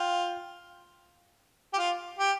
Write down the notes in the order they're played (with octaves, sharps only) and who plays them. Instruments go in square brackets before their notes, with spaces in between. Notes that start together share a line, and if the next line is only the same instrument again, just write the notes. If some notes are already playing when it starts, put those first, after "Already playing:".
Already playing: [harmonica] F4 [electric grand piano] G5
[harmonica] G4
F4
G4